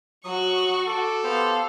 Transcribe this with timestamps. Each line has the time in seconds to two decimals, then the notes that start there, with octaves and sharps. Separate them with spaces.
0.25 F#3 F#4 C#6 D#6
0.88 A4 D6
1.24 B3 G4 C5 F5